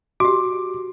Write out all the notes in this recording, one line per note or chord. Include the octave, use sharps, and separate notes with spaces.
F#4 G4 D6